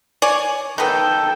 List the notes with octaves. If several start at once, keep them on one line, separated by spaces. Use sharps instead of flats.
C#5 D5 G#5
D#3 B3 A4 G5